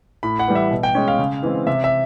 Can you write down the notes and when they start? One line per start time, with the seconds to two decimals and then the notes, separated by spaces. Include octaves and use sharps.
0.23 A2 B5
0.39 F#5
0.48 E3 G3
0.55 E5
0.71 B2
0.83 G5
0.95 G#3 C#4
1.08 F5
1.19 C#3
1.43 E3 G#3 C4
1.67 C3 E5
1.84 E5